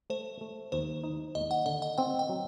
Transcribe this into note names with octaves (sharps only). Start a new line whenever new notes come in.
A3 C5
A3
D#2 C5
D#4
D#2 D#5
F#5
D3 D#5
F#5
C4 G5
G5
F#3